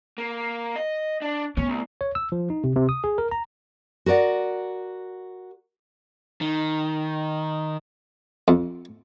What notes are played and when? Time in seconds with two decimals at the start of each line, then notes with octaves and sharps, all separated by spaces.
0.18 A#3
0.76 D#5
1.22 D4
1.57 A3 B3 C#4
1.69 C2
2.01 C#5
2.15 E6
2.32 F3
2.50 D#4
2.64 C3
2.76 C3
2.89 D#6
3.04 G#4
3.18 A#4
3.31 A#5
4.06 F#4 A#4 D5 F#5
6.41 D#3
8.48 F2